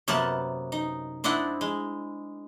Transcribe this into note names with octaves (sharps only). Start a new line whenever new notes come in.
F#2 C3 A#3 B3 F#5 A5
D#4
C4 D4 E4 D#5 F#5
G#3